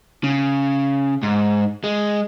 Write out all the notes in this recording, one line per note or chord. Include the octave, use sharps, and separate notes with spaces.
C#3
G#2
G#3